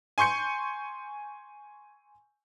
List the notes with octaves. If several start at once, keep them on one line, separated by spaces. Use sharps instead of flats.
G#5 C6 C#6 G6 C#7